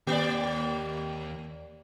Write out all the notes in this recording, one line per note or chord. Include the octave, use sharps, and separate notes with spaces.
D#2 A#3 G4 D5 G5